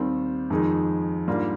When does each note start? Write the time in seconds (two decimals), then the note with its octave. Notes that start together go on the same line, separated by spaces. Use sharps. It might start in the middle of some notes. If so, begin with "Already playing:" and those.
Already playing: D#2 D#3 G3 C4
0.50 F2 D#3 G#3 D#4
1.28 G#2 G3 A#3 D4 F4